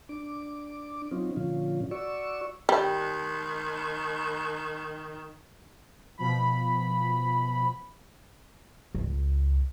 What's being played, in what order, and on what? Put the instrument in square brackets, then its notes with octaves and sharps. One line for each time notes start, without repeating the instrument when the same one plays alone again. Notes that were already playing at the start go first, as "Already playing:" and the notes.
[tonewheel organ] D4 D6
F#3 C4 C#4 D#4 F4
A#2 D3 F3 C#4 F4
F#4 D5 C#6 E6
[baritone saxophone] D#3 [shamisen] G3
[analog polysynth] B2 F3 B5
[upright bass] C#2